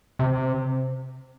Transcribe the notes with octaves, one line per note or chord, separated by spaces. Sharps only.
C3